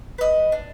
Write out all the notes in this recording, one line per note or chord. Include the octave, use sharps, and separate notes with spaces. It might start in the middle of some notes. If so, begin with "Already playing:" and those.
B4 D#5
D4